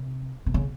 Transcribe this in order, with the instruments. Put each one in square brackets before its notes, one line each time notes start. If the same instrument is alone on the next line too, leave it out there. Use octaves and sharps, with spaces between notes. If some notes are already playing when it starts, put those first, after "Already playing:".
Already playing: [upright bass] C3
C3
C#3